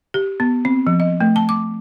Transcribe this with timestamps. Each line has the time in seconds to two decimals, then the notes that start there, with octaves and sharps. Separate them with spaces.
0.14 G4
0.40 B3
0.65 C4
0.87 F3
1.00 D#5
1.21 A3
1.36 A5
1.49 D6